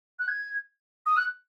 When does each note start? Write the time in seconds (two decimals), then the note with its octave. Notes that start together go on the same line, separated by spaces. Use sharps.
0.19 F#6
0.28 G#6
1.06 D#6
1.17 F#6